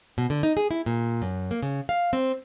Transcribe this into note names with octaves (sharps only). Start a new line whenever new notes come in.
B2
D3
D#4
G#4
E4
A#2
F#2
A#3
C#3
F5
C4